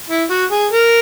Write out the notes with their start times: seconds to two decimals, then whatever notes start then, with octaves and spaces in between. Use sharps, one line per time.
0.10 E4
0.30 F#4
0.51 G#4
0.72 A#4